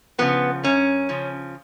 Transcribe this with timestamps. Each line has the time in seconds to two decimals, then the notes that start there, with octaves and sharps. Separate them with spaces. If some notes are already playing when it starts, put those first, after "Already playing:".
0.18 C#3 F3 B3
0.64 F#2 C#4
1.09 C#3 F3